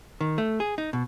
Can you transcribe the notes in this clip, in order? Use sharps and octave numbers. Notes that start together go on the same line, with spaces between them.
D#3
A3
G#4
D#4
B2